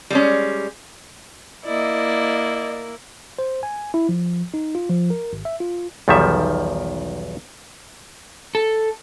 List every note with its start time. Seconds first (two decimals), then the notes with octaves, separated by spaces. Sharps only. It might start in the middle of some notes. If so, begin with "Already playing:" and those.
0.10 G3 G#3 C#4
1.65 A#3 E4 D5 D#5
3.39 C5
3.63 G#5
3.94 E4
4.09 F3
4.54 D#4
4.75 F4
4.89 F3
5.10 A#4
5.33 G#1
5.45 E5
5.60 F4
6.08 B1 E2 D#3 F3 G3 E5
8.55 A4